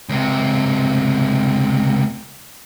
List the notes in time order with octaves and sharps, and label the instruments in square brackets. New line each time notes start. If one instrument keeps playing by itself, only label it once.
[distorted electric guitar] C#2 C3